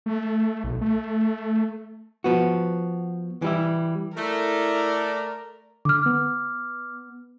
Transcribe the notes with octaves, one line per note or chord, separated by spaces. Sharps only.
A3
B1
A3
F3 B3 F#4
E3 G3 E4
A3 E4 A#4 D5
D3 D6 F6
B3